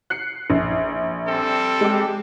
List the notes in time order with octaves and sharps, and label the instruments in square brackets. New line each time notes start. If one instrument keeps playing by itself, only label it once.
[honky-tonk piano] F#6 C7 C#7
A#1
[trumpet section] G3 C4 A4
[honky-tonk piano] G#3 G4